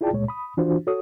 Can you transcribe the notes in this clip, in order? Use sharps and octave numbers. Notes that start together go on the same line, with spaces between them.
E4 F4 G#4 D5 G5 A5
C#2 A#2 G#3 C#5
B5 D#6
E3 D4 F4 F#4 C5
F#4 A4 C#5 D#6